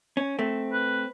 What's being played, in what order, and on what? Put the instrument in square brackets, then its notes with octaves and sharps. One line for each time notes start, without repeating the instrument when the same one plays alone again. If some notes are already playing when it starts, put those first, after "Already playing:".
[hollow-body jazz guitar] C#4
A3 C4
[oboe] B4